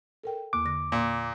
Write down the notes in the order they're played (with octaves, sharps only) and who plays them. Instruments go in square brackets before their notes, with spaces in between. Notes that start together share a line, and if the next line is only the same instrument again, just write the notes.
[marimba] A4 A#4 G5
[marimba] E2 A#3 F#6 [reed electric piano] D6
[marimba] D3 A#6
[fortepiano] A#2